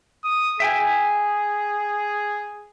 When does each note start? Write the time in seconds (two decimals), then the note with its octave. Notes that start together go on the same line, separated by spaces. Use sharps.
0.25 D#6
0.60 G#4 E5 G5 G#5